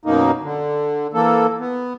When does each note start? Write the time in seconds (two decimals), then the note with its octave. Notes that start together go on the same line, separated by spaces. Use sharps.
0.05 F#2 B2 A#3 D#4
0.43 D3
1.14 E3 A#3 A4
1.60 B3